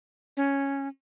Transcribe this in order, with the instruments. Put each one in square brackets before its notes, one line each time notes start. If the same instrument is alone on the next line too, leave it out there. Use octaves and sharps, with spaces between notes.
[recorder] C#4